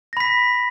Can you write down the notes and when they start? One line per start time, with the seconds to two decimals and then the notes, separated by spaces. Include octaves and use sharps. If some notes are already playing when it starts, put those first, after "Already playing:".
0.13 A#6
0.17 B5
0.20 B6